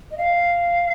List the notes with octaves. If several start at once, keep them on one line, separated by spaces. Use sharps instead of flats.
D#5
F5